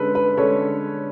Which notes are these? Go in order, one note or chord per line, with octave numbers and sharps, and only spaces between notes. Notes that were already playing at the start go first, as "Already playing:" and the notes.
Already playing: D3 G#3 C#4 A4 B4
B4
D3 G#3 C#4 A4 C#5